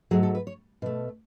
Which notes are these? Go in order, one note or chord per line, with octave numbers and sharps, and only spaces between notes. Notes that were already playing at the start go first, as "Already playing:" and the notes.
G#2 F#3 A3 G#4
A4
B4
C#5
B2 A3